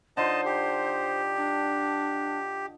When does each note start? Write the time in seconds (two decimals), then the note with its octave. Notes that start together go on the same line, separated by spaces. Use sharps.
0.17 D3 D#4 F4 C5 D#5 A5
0.45 G4
1.36 D4